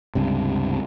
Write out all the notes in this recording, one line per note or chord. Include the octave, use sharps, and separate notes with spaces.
C#2 G2 C3